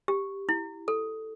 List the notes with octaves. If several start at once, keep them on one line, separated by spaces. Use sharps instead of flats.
G4
E4
A4